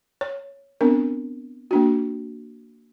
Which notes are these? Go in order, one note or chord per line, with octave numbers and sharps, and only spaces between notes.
C#5
B3 C4 D4 A#4
A#3 D4 F#4